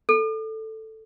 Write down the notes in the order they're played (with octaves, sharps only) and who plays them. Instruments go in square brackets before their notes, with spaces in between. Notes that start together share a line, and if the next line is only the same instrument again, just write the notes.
[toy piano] A4